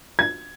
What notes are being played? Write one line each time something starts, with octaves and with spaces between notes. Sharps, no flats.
G#6